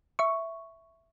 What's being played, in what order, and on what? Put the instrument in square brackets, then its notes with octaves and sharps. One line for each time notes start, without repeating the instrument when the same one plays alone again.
[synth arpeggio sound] E5 C#6